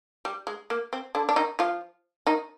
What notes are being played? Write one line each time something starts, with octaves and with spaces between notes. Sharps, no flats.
G3
G#3
A#3
C4
D3 D4
D4
D#3 D#4
F3 F4
D#3 D#4